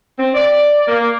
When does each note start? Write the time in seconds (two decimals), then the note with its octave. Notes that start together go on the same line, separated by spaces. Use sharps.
0.19 C4
0.34 D5
0.86 A#3